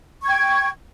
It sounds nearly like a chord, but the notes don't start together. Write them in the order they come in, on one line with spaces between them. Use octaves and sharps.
C#6 G#6 G5